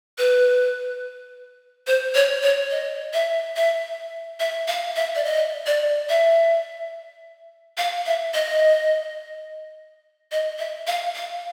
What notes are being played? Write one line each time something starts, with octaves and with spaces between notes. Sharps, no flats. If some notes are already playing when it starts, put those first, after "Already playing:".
B4
C5
C#5
C#5
D#5
E5
E5
E5
F5
E5
D5
D#5
D5
E5
F5
E5
D#5
D#5
E5
F5
F5